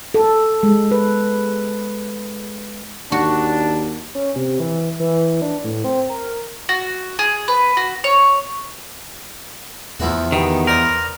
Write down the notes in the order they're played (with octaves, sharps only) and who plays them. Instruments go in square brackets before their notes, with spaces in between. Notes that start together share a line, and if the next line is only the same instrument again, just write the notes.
[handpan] A4
G#3
B4
[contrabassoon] D#2 [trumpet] D4 [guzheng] F#4
[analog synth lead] C#4
C3
E3
E3
D4
A2
C4
A#4
[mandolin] F#4
G#4
B4
F#4
C#5
[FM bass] E2 [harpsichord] F3 E4 F#4
[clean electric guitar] D#3 [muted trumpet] B3 [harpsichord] G4
[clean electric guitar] A#4 [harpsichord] C5 D5 D#6